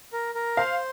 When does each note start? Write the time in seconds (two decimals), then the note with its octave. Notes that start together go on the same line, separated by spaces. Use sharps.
0.13 A#4
0.35 A#4
0.57 C5 F5